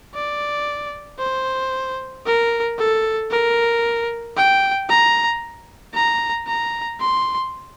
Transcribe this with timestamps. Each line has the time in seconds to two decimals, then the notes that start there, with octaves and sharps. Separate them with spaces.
0.15 D5
1.20 C5
2.26 A#4
2.79 A4
3.31 A#4
4.36 G5
4.89 A#5
5.94 A#5
6.47 A#5
7.00 C6